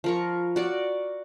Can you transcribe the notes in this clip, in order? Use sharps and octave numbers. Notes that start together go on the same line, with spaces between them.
F3 A#4 C#6
F#4 D5